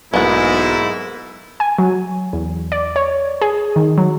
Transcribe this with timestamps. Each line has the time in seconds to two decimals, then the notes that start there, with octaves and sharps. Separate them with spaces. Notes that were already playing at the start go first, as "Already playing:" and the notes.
0.14 B1 G#2 A#3 B3 E4
1.60 G#5
1.79 F#3
2.33 E2
2.72 D5
2.96 C#5
3.42 G#4
3.76 D#3
3.98 F#3